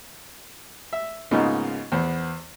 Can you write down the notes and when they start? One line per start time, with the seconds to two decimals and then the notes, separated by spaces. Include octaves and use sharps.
0.93 E5
1.31 G#2 C#3 A#3 B3 D#4 F4
1.92 E2 B3 C5